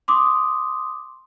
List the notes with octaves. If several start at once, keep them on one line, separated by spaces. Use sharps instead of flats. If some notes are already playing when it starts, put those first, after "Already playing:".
C6 D6 D#6